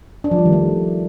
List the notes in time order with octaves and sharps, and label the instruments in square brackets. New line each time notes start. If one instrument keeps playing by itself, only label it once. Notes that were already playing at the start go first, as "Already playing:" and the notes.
[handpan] D4
F3
G3
D#3
A3